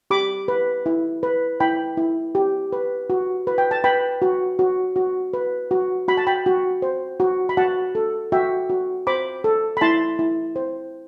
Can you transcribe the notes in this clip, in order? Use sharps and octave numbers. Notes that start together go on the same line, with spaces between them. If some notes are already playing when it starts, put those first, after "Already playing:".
G4 B5 D6
B4
E4
B4
E4 G5 B5
E4
G4
B4
F#4
B4
G5
A5
B4 G5 B5
F#4
F#4
F#4
B4
F#4
F#4 B5
A5
G5 B5
F#4
C5
F#4
B5
F#4 F#5 A5
A4
F#4 E5 G5
F#4
C5 B5 D6
A4
B5
E4 A5 C6
E4
C5